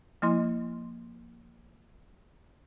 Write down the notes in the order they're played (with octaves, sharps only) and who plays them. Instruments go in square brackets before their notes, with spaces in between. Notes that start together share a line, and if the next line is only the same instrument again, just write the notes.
[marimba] F3 A#3 E4 D#5 C6